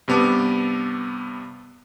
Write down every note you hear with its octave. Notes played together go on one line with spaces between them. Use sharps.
G2 C3 B3 A5 D6